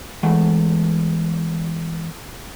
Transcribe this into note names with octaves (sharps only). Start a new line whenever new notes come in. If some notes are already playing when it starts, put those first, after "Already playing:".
E2 E3 G#3 A3 F#5